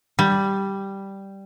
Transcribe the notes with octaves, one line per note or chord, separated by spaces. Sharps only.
G3